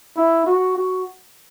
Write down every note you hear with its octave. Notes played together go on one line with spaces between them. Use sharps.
E4
F#4
F#4